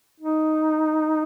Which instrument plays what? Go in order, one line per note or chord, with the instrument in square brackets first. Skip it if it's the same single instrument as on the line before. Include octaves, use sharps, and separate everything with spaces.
[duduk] D#4